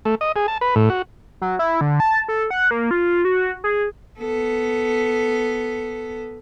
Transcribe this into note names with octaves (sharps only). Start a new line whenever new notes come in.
A3
D#5
G#4
A5
B4
A2
F#4
F#3
E4
D3
A5
A4
F#5
A#3
F4
F#4
G#4
B3 A4